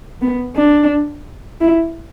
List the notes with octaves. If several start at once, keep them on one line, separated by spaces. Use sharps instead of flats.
B3
D4
E4